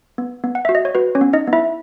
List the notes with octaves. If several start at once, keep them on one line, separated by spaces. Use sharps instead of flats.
B3
B3
F#5
F#4 E5
D#5
C#5
F#4 B4
C#4 C#5
B3
D#4 D#5
B3
E4 E5